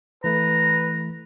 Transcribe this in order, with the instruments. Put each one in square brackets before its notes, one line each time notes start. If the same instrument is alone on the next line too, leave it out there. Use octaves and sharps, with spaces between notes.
[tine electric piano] E3 A3 [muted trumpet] B4 [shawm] A#5